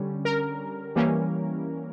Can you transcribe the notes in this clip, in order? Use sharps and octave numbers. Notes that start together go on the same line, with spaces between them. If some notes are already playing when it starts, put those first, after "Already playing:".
Already playing: D3 G3 C#4
A#4
E3 G3 A#3 C#4